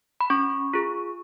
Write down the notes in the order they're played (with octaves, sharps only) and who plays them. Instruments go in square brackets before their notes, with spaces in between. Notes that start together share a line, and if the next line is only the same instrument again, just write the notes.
[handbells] B5
C#4 C#6
F4 G#4